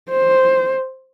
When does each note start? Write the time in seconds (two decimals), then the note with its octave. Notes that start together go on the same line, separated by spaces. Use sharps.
0.10 C5